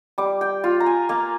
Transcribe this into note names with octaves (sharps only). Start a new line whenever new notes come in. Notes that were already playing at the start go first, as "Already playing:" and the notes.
G3 D6
G5
F4
A#5
G#5
A#3 F5